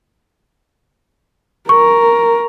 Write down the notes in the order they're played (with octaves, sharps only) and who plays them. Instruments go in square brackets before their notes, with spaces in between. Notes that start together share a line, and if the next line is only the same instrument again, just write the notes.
[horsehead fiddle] A#4 [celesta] C#6